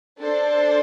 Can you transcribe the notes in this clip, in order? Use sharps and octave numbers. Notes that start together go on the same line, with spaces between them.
D4 A4 C5